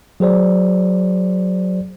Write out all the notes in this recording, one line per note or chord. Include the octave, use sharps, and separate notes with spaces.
F#3 G#4 C5 D5